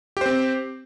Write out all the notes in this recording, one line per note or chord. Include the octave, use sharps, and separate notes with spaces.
C4 G4 C5